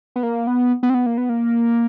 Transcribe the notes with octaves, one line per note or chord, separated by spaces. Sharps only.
B3
A#3
B3
B3
C4
B3
A#3
B3
A#3